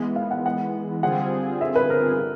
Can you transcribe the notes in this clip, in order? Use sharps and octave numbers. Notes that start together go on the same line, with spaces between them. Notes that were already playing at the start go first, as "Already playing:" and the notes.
Already playing: E3 G#3 B3
F5
F#5
F#5
D3 G3 C4 F4 G#4 F#5
E5
B4
A#4
D3